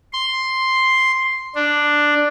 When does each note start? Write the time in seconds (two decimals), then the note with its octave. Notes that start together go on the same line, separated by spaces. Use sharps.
0.13 C6
1.55 D4